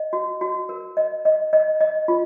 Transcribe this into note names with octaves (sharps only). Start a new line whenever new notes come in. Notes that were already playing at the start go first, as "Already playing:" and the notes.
Already playing: D#5
F#4
F#4
A#4
D#5
D#5
D#5
D#5
F4